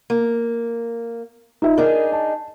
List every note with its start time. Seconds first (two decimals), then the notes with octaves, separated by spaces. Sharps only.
0.10 A#3
1.62 D#4 F4 E5
1.77 D4 D#4 G#4 A#4
2.12 A5